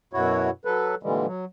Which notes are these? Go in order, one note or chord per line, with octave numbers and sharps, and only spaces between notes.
F#2 B2 E4 F#4 C#5
F#3 A4 B4
A#2 D3 E3 G3 G#3
F#3